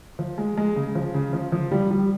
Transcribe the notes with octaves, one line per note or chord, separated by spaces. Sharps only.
F3
G#3
G#3
C#3
F3
C#3
F3
F3
G3
G3